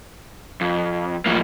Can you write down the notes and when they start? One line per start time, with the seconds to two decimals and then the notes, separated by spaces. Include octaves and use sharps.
0.61 F2
1.26 F#2 A2 F3 A#3